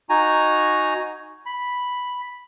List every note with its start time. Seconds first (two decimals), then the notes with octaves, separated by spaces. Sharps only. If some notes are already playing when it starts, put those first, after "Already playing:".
0.10 D#4 F#4 G#5 A#5
1.46 B5